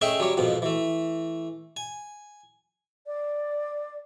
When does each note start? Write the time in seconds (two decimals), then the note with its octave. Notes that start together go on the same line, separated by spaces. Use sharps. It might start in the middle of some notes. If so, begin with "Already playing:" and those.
0.01 A3 C#4 G#4 D#5 E5 G5
0.20 F#3 G3 C#5
0.37 F2 G#2 B2 F3
0.62 E3 A3
1.77 G#5
3.06 D5